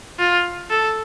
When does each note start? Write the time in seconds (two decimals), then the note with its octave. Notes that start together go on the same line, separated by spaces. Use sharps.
0.19 F4
0.70 A4